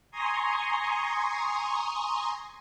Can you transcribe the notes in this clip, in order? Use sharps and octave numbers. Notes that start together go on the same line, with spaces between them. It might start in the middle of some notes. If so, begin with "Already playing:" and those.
G#5 A#5 C6 C#6 D#6